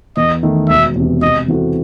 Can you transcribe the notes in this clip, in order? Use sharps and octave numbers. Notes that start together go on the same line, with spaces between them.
E2 D#5
D#3 A3
E1 E5
E2 C3
C3 D#5
E3 C4 F#4 A4